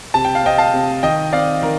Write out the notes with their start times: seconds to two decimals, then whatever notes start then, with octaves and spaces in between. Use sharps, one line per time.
0.14 C3 A5
0.25 G5
0.35 F5
0.44 C4 D#5 G5
0.58 F5 A5
0.74 C3
1.03 D#3 D#5 G5
1.33 C4 D5 F5
1.62 D#3 A#4